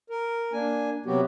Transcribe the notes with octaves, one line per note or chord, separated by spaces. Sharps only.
A#4
A#3 D4 G#5
C3 F#3 B3 F#4 G4